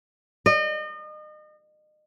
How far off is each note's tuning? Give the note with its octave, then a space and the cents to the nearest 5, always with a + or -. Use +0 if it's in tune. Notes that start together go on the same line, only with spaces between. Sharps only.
D#5 -35